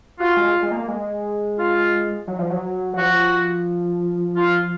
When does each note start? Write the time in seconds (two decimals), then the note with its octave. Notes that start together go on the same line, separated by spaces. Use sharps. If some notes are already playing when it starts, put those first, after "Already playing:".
0.20 F4 F#4
0.37 G#3
0.62 G#3
0.71 A#3
0.88 G#3
1.58 F4
2.28 F#3
2.39 F3
2.50 F#3
2.93 F#3
2.97 F3 F#4
4.36 F4